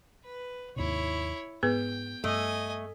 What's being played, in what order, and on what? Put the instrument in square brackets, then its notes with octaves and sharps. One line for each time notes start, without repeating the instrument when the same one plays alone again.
[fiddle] B4
[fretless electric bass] D#2 G#2 C3 [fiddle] E4 C#5
[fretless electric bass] G#2 [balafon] B3 G#4 B4 [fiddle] G5
[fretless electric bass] G2 [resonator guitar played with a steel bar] A3 [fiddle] D#5 G#5